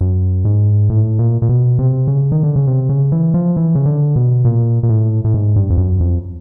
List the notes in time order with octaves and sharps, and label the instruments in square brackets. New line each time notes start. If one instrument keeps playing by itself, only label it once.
[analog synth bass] F#2
G#2
A2
A#2
A#2
B2
C3
C#3
D#3
D3
C#3
C3
C#3
E3
F3
E3
C#3
D3
B2
A#2
A#2
A2
A2
G#2
G2
F2
F#2
F2